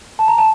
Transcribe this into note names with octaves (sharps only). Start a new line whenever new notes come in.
A5
A#5
A5